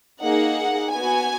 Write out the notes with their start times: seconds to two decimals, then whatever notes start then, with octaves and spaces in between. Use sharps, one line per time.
0.22 A#3 D#4 G#4 F#5
0.90 B3 F#4 G#5